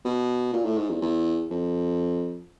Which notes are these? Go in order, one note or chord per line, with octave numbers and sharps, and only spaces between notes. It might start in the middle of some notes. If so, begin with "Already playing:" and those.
B2
A#2
A2
G#2
E2
E2
F2